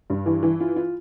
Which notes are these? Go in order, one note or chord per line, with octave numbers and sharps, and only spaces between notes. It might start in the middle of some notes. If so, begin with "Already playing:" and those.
G2
E3
E3
F4
F4